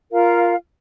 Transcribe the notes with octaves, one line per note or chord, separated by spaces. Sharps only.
F4 A#4 F5 A#5